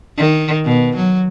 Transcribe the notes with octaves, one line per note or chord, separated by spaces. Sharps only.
D#3
B2
F#3